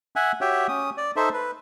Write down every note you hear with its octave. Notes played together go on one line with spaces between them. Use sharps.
E5 F#5 G#5
F#4 G4 C#5 E5 G5
C#4 D#6
D5
D#4 A4 C5 E5
B4